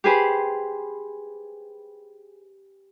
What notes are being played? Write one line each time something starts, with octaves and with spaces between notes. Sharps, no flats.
G4 G#4 B4 C5